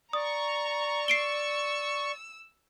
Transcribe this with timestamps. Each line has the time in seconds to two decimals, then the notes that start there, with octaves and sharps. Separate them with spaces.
0.13 D5 A#5 C#6 D#6
1.08 E6 C7 D7 G7